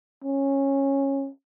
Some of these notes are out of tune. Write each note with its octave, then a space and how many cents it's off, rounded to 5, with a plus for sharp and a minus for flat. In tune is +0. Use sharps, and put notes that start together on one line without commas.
C#4 -15